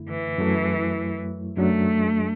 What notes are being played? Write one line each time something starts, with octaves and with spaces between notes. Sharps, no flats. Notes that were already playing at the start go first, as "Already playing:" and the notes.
Already playing: F#2 D3 A3 E4
E3
F#2 F#3 A3 E4
F#2 F#3 A3 D4